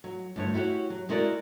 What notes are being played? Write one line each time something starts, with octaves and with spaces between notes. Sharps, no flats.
F#3
D2 G2 C#5
E4 F#4 G4 C#5
F#3
G#3 E4 F#4 A#4 D5